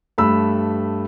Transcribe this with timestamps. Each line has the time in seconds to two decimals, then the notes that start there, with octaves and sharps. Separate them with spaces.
0.18 G2 A3 B5 E6